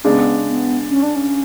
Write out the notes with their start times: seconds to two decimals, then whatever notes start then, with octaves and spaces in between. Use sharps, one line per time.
0.05 C#3 G#3 B3 D4
0.48 B3
0.90 C#4
1.03 D4
1.16 C#4